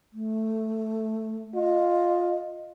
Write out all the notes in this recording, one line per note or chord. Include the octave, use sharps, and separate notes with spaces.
A3
F4 D#5